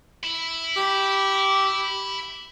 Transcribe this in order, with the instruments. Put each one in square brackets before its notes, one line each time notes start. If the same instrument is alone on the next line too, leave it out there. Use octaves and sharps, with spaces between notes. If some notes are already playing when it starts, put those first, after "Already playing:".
[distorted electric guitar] E4
[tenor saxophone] G4